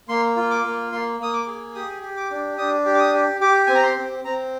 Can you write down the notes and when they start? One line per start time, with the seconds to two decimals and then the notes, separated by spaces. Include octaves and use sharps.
0.09 A#3 C6
0.36 F4
0.50 D6
0.64 A#3
0.92 A#3 C6
1.20 A#3 D#6
1.33 D6
1.47 G#4
1.75 G4 D#6
2.02 G4
2.16 D6
2.30 D4
2.57 D4 D#6
2.85 G4
2.95 D6
2.99 D#6
3.14 G4
3.41 G4 D6
3.67 C4 G#5
3.75 A#5
3.83 C6
3.96 C4
4.24 C4 A#5